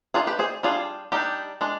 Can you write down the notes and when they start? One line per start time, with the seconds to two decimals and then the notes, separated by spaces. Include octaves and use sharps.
0.14 D#3 G3 D4 F4 G#4
0.27 G4 B4
0.39 G#4 C5
0.63 G3 D4 F4 G#4
1.12 G3 D4 D#4 G4
1.61 G#3 D4